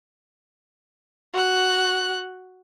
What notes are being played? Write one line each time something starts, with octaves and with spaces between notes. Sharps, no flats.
F#4 F#6